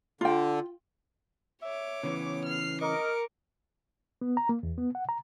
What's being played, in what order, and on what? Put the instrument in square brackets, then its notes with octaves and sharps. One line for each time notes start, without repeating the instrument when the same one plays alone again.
[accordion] D3 [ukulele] F4 G5
[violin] C#5 D6 [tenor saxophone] E5
[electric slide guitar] C#3 E3 C#4 [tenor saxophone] B3
[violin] F6 C7
[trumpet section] A#4 [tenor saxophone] D#5 [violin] C#6 D6
[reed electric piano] B3
A#5
A#3
E2
B3
F#5
A#5